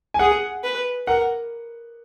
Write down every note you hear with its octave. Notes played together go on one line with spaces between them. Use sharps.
G#5
G#4 F#5
B4
A#4 F#5